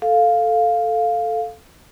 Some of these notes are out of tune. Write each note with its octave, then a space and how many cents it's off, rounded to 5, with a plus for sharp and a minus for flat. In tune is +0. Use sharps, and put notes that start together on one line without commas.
A4 +0 F5 +0